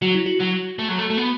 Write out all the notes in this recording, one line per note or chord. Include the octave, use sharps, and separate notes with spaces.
F#3 F#4
E4
F#4
F#3
A3
F#3
A3
A3
B3